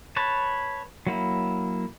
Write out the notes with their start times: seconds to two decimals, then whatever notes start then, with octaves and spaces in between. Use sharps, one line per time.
0.16 B4 C#5 A5
1.07 F#3 A#3 E4